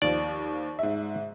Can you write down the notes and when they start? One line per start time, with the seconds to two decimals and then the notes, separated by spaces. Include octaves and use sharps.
0.02 D#2 F3 D5
0.79 G#2 E5